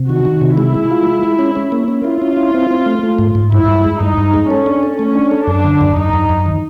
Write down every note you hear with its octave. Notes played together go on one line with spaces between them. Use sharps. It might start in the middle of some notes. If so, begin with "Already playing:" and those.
Already playing: C3
D#3 F#4
D#3
C3
G#3 E4
G#3
F4
G#3
G#3
C#4
C#4
A#3
C#4
E4 F4
C#4
E4
C4
C4
A3
A3
G#2
G#2
G2 E4
G2
G#3
G2 D#4
G2
G#3
C#4 A4
D4
A4
A3 C#4
D4
A4
F#2 D4
D3
F#2
F#2 D#4
F#2
F#2
D#3